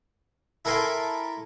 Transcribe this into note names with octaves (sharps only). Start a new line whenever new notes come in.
E4 A4 A#4 G#5 C6 D6